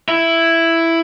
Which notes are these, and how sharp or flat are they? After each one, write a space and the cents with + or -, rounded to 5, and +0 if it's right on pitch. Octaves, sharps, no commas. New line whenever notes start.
E4 +5